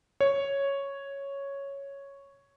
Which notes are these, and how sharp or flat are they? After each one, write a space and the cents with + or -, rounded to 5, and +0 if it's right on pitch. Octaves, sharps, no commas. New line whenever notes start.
C#5 +0